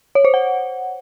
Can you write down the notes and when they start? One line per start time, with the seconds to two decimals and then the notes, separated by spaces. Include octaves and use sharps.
0.15 C#5
0.25 C5
0.34 F#5